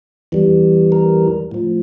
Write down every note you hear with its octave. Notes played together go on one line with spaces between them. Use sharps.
E2 E3 G3
A#4
A2 F3